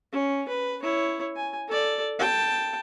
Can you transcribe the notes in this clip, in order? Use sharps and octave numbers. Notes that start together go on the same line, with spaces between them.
C#4
B4
E4 C#5
G#5
A4 D5
G5 A5